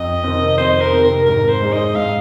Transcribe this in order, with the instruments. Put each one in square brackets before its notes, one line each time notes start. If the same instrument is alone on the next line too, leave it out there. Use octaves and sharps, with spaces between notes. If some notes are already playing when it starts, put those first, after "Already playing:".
Already playing: [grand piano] F2 [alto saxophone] D#5
[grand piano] C3 D#3 C4
[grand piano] F2 [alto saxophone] C5
[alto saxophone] A#4
[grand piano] C3 D#3 C4
[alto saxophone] A#4
[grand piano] G#2 [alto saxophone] A#4
[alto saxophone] C5
[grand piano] G#3 D#4 G#4
[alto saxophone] D#5
[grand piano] G#2 [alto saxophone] F5